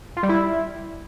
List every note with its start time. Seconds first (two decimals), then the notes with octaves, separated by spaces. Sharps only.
0.17 F4
0.23 G3
0.29 E4